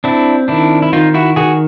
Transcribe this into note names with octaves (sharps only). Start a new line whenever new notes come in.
C4 D4 E4
D#3 D4 E4
E4
D#3 D#4 F4
E4 F#4
D#3 F#4 G#4